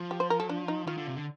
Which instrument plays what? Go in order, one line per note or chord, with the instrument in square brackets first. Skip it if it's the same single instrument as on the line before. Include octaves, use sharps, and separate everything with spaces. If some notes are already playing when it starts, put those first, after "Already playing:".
Already playing: [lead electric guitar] F3
[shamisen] G4
C5
A#4
A4
D4
D#4
[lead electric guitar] D#3 [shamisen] F4
[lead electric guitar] D3
C3
D3